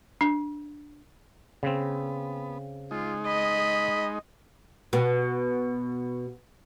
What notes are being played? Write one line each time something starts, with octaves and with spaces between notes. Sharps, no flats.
D4
C#3 B3 C4
G#3 D#4 F4
D#5 B5
B2 B3